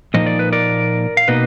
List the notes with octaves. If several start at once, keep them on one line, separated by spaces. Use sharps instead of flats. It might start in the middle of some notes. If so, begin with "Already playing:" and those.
A#2 F3 A#3 D#4 D#5
D5
B4
A#4 D5
F5
B2 A#3 D#4 B4 D#5